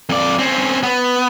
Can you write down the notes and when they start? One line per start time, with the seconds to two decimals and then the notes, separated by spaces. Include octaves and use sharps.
0.09 F2 D5
0.39 C4 C#4
0.83 B3